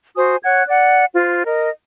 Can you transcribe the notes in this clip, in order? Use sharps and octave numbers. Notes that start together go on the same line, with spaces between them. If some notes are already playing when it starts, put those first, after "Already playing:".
F#4 C5 G#5 D#6
C#5 F#5 F#6 G#6
D5 F#5
F4 C5
A#4 D#5